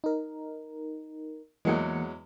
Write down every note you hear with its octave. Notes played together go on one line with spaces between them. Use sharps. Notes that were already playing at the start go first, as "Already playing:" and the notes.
D#4 A#4
E2 E3 F#3 G#3 A#3 C#7